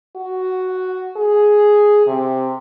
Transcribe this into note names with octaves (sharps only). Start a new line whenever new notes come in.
F#4
G#4
C3